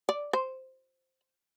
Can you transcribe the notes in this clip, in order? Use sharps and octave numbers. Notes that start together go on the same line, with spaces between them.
D5
C5